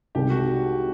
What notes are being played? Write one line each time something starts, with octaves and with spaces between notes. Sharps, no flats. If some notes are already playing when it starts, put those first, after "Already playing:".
C2 C3 D#3 G#3 G4
F#4